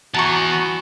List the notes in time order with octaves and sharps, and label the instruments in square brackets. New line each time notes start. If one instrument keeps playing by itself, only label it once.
[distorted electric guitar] E3 B3 [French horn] F#4 [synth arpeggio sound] A5 A#5 C#6